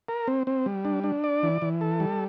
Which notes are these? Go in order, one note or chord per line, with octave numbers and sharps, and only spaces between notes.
A#4
C4
C4
G3
D4
D4
D5
E3
E3
A4
G3